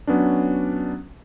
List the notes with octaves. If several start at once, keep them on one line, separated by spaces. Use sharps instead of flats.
F#3 B3 C#4 D4